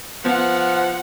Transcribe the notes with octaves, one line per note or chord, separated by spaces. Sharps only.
F3 B3 F#5